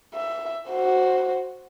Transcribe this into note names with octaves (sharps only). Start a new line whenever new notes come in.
E5
F#4 C5